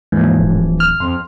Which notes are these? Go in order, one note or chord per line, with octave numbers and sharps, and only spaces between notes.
D#2 G#2 E3 F3
D1
F6
F2 C6